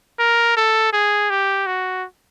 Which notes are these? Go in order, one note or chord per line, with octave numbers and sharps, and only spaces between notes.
A#4
A4
G#4
G4
F#4